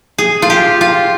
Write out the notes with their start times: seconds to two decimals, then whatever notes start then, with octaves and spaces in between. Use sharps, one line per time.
0.18 G#4
0.42 F4
0.50 G4
0.81 F4